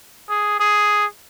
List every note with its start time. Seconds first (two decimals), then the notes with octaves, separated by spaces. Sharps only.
0.29 G#4
0.60 G#4